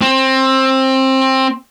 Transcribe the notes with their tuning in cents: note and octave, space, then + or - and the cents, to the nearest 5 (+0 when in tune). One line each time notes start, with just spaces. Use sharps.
C4 +20